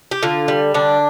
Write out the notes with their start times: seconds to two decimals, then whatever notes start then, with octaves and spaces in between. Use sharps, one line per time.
0.11 G4
0.23 D3 F4
0.48 G3
0.74 D3 D4